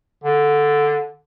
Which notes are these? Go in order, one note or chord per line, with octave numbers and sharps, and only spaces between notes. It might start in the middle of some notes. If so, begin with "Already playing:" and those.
D3